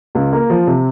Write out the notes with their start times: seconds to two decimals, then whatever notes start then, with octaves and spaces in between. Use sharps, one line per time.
0.15 C#2
0.32 A#3
0.50 F3
0.67 C3